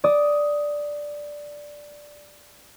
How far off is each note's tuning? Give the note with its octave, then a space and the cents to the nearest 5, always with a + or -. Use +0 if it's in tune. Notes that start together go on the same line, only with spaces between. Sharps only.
D5 +0 D#6 +10